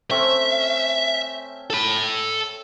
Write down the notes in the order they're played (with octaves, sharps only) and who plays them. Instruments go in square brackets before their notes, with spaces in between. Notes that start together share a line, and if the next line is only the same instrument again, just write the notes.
[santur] A3 C4 C#4 [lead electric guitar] E5
[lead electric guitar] A4 B5